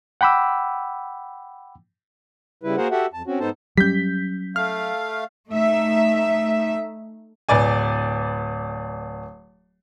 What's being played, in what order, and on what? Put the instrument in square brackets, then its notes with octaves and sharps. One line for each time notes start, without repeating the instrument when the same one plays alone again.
[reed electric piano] F#5 G5 B5 D6 E6
[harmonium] C#3 G3 E4 B4
A#3 F#4 G#4 A#4 C5 F#5
F#4 G4 A4 E5 F#5
F2 A5
C4 C#4 F#4
G#2 B3 D#4 A4 C5 A5
[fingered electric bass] F#3 C#4 [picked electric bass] G3 [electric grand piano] G6 B6
[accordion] A3 F5 [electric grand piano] F6
[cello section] A3 D#4 E5
[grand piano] D1 B4 D5 G#5